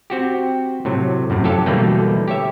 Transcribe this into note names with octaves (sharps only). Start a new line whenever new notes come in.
C4 F#4 G4
A2 C3 F#3
F#2 A2 C3
F#3 G4 A4 F5
B2 D3 E3 G3 A3 A#3
G4 C#5 E5